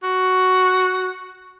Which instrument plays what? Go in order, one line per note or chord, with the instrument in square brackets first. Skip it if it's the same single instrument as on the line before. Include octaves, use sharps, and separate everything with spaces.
[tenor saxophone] F#4